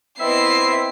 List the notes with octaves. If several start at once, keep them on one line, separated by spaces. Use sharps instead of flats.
B3 C4 E4 D#5 E5 C7